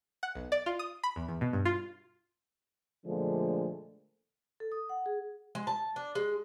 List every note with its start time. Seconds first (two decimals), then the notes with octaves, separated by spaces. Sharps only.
0.23 F#5
0.35 B1
0.52 D5
0.66 F4
0.79 D#6
1.03 B5
1.16 E2
1.28 E2
1.41 B2
1.53 G2
1.65 F4
3.06 A#2 D3 F3 G#3 A3 D4
4.60 A4
4.72 D#6
4.89 F#5
5.06 G#4
5.55 G#3
5.67 A5
5.96 D4
6.15 G#3